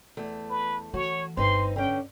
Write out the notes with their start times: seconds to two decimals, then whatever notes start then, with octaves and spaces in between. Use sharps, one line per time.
0.17 E2 A3
0.50 B4
0.94 E3 F#4 C#5
1.37 G1 C4 D#4 B4 C6
1.76 D3 C#4 G5